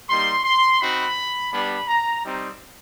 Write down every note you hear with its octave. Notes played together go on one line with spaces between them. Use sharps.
G3 A#3 D#4 C6
C6
C4 D#4 F#4 B5
G3 B3 D4 B5
A#5
G3 C4 D#4